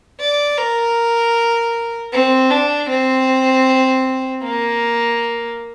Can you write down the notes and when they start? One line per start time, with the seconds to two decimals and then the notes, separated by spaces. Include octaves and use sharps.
0.20 D5
0.58 A#4
2.13 C4
2.51 D4
2.89 C4
4.43 A#3